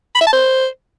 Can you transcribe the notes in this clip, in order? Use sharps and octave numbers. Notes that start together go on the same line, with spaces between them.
B5
E5
A5
C5